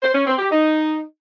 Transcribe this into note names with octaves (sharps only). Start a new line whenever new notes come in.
C5
C#4
C4
G4
D#4